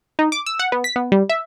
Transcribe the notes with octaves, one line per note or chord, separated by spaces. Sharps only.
D#4
D6
E6
F#5
B3
B6
B3
G3
E5